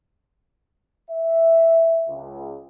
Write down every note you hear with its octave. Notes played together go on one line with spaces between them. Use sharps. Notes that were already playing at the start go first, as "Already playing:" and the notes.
E5
C#2